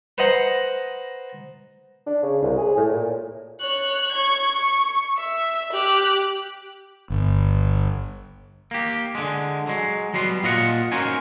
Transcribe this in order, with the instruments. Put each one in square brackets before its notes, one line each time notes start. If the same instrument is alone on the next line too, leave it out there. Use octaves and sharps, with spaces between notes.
[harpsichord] B4 C5 D#5 F#5 A#5
[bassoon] D4
C#3
C2
G#4
A2
A#2
[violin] C#5 F#6
C#6 G#6
C#6
E5
G4 F#6
[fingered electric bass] G1
[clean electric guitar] A#3 G4
D3 G#3
F#3 G#3
F#3 G3 B3 C6
A#2 F4 D#5 F#5
C#4 D#4 F#4 A#4 C5 G#5